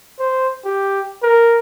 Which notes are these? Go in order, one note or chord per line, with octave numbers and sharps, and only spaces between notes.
C5
G4
A#4